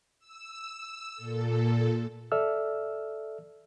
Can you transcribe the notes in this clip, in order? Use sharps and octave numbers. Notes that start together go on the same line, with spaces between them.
E6
A#2 A4
A4 D5 E5 E6 F6